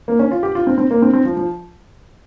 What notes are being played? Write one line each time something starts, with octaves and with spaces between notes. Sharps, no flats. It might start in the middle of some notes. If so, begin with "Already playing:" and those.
A#3
C#4
F4
G4
F4
C4
C4
A#3
C4
C4
F3
F3